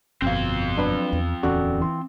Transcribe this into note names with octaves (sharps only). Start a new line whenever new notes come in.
G1 F2 B2 C4 F5
F#3 D4 B4
E2
D1 E2 C#4 F#4 A4 D5
E3 C6